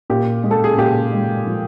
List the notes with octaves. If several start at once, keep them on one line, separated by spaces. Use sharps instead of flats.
A#2 G4
G#3
A4
G#4
A#2 G4
G#3
F3